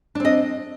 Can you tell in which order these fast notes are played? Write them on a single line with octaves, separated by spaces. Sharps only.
D4 C4 D#5